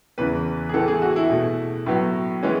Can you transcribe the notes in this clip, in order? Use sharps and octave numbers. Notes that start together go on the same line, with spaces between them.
E2 C#3 E3 B4
G#4
A2 E3 B3 A4
G#4
F#4
E4
B2 A3
A2 F#3 B3
E3 G#3 B3 C#4